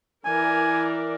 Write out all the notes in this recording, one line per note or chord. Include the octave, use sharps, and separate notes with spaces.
E3 A#4 D5 G#5